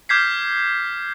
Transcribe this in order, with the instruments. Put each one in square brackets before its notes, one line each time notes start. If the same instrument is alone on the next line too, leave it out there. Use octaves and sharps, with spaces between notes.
[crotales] D6 F6 G6 G#6 B6 C7